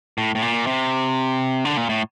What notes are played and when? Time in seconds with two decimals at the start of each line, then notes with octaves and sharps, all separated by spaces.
0.18 A2
0.35 A2
0.42 A#2
0.67 C3
1.65 D3
1.77 A#2
1.89 A2